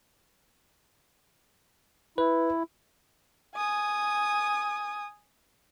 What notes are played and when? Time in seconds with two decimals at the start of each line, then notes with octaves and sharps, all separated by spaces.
2.18 E4 B4
3.55 G#5 D#6